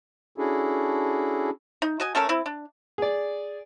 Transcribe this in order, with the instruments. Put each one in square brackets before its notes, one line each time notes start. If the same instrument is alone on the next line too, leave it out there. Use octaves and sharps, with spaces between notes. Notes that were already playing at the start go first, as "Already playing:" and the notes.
[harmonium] C#4 D4 E4 F#4 G#4 A4
[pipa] D#4
F#4 D#5 G#5
A3 C#4 A4 A#4
C4 E4
D4
[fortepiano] G#4 D5